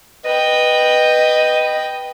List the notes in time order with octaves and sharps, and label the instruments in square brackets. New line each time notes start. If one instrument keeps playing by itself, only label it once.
[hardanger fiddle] B4 G5 [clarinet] D#5